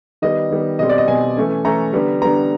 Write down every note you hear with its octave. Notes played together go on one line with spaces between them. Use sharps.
D#3 G3 B3 D#5
D#3 G3 B3
B2 G3 C4 D#5
D5
D#5
B2 G3 C4 G#5
E3 A3 C#4
E3 A3 C#4 A#5
D3 G3 B3
D3 G3 B3 A#5